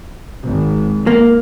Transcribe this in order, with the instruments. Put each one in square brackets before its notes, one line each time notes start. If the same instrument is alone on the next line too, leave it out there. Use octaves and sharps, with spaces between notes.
[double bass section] G#1
[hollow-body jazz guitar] A#3